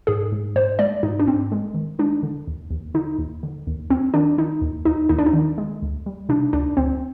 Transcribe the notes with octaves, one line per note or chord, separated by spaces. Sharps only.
G#2 G#4
G#2
G#2 C5
G#3 D5
G#2 D#4
D4
G#2 C4
G#3
D#3
G#3 D4
D3
D#2
D#2
D3 D#4
D#2
D3
D#2
D#2 C4
D#3 D4
D#3 D#4
D#2
D#2 D#4
D#2 D#4
D4
D#4
D#3
G#3
D2
G3
C3 D4
D2 D4
D2 C4